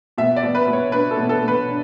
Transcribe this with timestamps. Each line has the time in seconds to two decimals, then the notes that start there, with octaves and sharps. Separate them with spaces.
0.18 B2 E5
0.36 D5
0.43 B2
0.55 B4
0.66 B2 B4
0.73 C#5
0.92 D4 B4
1.11 A4
1.17 B2
1.29 A4
1.43 B2
1.48 B4
1.68 D4